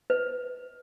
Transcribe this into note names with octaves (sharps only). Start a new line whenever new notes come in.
B4